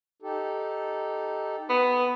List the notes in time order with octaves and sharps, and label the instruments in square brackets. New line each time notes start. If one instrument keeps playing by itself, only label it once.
[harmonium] D#4 G4 A4
[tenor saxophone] B3